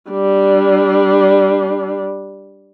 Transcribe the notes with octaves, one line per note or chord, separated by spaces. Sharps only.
G3 D4